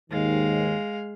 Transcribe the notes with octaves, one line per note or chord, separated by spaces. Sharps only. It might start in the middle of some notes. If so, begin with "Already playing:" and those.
D#2 G#2 D#3 G#3 F5